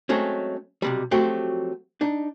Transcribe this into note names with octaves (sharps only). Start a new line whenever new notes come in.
F#3 G#3 A3 C4 C#4
B1 C3 G3
F3 F#3 A3 C4 F#4 G4
D4 D#4